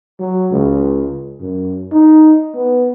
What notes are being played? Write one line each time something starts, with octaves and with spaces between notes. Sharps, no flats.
F#3
C#2
F#2
D#4
B3